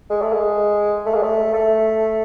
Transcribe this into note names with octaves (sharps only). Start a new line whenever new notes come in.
G#3
A3
G#3
A3
G#3
A3
A3